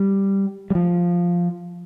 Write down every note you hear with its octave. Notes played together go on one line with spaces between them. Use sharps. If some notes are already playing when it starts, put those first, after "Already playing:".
Already playing: G3
G3
F3